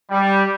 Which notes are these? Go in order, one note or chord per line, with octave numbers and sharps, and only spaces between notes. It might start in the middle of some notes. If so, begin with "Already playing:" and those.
G3